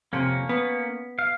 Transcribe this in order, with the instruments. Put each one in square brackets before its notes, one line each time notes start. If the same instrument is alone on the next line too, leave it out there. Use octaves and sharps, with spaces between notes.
[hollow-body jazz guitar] F2 C3 [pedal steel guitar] A#3 C#4
[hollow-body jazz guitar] B3
[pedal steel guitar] F5